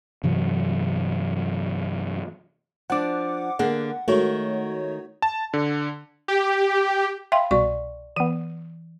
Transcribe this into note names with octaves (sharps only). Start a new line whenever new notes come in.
G2 C3 E3 F#3
F3 D4 F#5 D6
D3 A#3 G#4 F#5
D#3 G#3 A3 F#4 C#5
A5
D3
G4
E5 F5 G5 B5 C6
C2 B2 D5 C#6
E3 B3 D#7